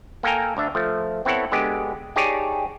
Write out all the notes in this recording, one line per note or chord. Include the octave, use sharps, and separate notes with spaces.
A#3 A4 G5 G#5 A#5
D2 D4 E5
F3 A3
B3 C4 E4 A4 C#5 F#5
D3 G#3 B3 G4
D#4 G4 G#4 C#5 D5 A5